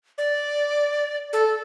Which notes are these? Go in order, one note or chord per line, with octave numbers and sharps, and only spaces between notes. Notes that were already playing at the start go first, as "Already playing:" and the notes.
D5
A4